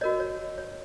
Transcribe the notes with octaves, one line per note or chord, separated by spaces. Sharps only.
F#4 A#4 C#5 D#5
C#5
C#5